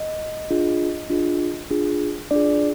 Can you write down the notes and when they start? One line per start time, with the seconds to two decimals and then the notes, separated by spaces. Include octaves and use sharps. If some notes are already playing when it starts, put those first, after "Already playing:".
Already playing: D#5
0.50 D4 F4 G#4
1.10 D4 F4 G#4
1.70 D4 F4 G#4
2.31 D4 F4 G#4 D5